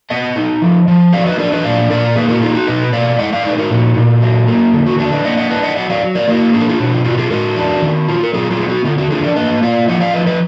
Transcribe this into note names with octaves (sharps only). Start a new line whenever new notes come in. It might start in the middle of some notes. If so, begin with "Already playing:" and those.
B3 D#5 F#5
D#4
F3
F3
F#3 D5 F5
B4 D#5
D4 A#4 D5
B4 D#5
A#2 D5 F5
A#2 A#4 D5
A#3 G#4 B4
F#4 A#4
D#4 F4 G#4
F#4
B2 B4 D#5
B2 D5 F5
G#3 D#5 F#5
D5 F5
D#4 D5
B4
F#4 A#4
A#2 F#4
A#2
F#3
A#3
D3
F#4
D4 F#4
B4 D#5
A#3 D#5 F#5
D#5 F#5
D4 B4 D#5
D#5 F#5
F#3 D#5 F#5
D5 F5
F#3
A#4 D5
A#3 F#4 A#4
D4 G#4
A#4
F4 G#4
B2 F#4
F4
F4 F#4
F4 G#4
G#3 F#4 A#4
D4
D#3
F4
A#4
F#3 F4 G#4
F4 G#4
B3
F#4
D3 F4
F#4
D4 F4 G#4
A#4 D5
A#3 B4 D#5
F4 D5 F5
F3 D#5 F#5
D5 F5
F3 B4 D#5
B4 D#5